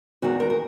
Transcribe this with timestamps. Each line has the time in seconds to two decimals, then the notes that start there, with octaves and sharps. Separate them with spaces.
0.22 E2 D#3 G#3 F#4
0.40 A#4
0.50 A#4